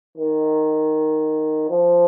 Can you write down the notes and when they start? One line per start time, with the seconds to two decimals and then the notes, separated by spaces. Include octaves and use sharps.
0.18 D#3
1.69 F3